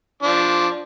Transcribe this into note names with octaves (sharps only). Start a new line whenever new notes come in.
F3 D4